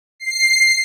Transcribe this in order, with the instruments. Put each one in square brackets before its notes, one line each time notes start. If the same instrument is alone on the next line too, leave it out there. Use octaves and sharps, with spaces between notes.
[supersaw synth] C7